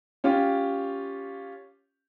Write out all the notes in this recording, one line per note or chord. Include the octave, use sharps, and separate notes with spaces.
C#4 F4 G4